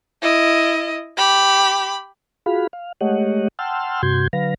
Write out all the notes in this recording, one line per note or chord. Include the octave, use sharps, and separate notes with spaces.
E4 D#5
G4 B5
F4 F#4 G#4 F5 B5
F5
G#3 A3 G4 C#5 D#5 F#5
F#5 G5 A5 C6 E6 F6
G2 C3 F#4 C6 G6 G#6
D3 F#3 B4 F5 A#6